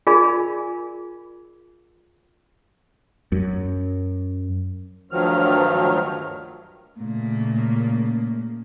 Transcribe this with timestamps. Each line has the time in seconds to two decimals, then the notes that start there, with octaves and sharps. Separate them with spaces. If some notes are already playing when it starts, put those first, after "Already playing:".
0.07 F4 G#4 A#4 D5 G#5 B5
3.32 F#2
5.11 D2 G2 D#3 F3 F#3 F6
6.98 A#2 C#3 A3 A#3